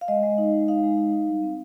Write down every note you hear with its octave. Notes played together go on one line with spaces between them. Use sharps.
F5
G#3 D#5
G#3
D#4
G#3
D#4 F5
G#3
D#4
D#4
G3
C4